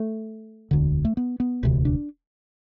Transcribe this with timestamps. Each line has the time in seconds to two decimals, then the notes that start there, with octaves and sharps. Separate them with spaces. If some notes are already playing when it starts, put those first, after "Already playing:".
Already playing: A3
0.71 E1 D2 D3
1.05 A3
1.17 B3
1.40 B3
1.63 E1 D2 C3
1.85 D4